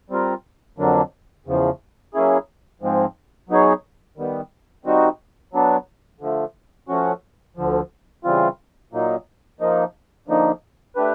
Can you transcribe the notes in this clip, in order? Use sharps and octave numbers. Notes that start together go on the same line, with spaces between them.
G3 C4 F4 A#4
F2 D3 F#3 A#3 D4
E2 C#3 F3
F#3 A#3 C#4 E4 G#4
G#2 F3 G#3 C4
F#3 B3 D#4 G#4 C#5
D#3 G3 B3
D#3 G3 C4 D#4 F#4
F#3 B3 D4
D3 F3 A3
F3 A3 C#4 F#4
D2 D3 F3
C#3 E3 G3 C4 F4
A#2 F#3 A#3 D#4
F3 A#3 D#4
D3 F3 A#3 D#4
A3 D4 G4 B4